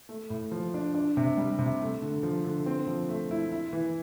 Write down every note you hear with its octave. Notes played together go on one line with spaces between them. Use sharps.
A3
A2
F3
D4
D4
C3
G3
C3
A3
D3
F3
D3
C4
F3
A3
E4
E4
E3